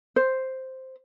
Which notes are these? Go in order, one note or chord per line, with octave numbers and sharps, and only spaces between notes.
C5